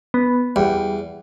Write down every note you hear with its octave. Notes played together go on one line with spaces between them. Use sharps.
B3
E2 G3